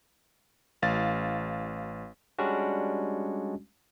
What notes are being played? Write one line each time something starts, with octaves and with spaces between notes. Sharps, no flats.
A1 F5 A6
G3 G#3 C#4 D4 F#4